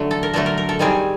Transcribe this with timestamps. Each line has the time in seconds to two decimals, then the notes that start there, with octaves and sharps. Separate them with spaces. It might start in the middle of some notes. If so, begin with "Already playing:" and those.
Already playing: D3 F#3 A3
0.11 A4
0.23 A#4
0.34 D3 F#3 A3 A4
0.46 A#4
0.58 A#4
0.69 A4
0.79 D#3 G3 C4 G#4